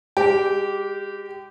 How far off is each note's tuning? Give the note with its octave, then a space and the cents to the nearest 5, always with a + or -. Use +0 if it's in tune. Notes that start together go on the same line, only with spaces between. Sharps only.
G#3 -40 G4 -15